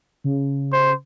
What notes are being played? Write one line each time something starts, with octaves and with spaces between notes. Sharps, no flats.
C#3
C5